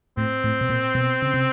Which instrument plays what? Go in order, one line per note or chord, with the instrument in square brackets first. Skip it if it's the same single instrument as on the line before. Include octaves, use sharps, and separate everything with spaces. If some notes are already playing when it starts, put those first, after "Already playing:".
[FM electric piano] A2 [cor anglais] C4
[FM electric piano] A2
B2
A#2
B2
C#3
C3